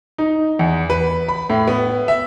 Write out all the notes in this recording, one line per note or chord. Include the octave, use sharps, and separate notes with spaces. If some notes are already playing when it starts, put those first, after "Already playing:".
D#4
E2
B4
B5
A2
B3
E5